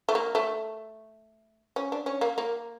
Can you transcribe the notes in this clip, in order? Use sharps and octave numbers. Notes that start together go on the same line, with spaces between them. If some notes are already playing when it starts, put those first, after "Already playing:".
A3
A#3
A3
C#4
D4
C#4
A#3
A#3